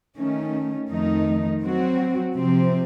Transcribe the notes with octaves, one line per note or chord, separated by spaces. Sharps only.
D#3 A3 C#4
F2 D#3 A3 D#4
F#3 C4 F#4
C3 F3 C4